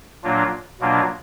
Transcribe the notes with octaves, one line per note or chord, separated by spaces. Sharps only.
A#2 F#3 A#3 D4 F4
B2 F#3 A#3 D4 F4